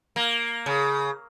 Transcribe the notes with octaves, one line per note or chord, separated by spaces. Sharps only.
A#3
C#3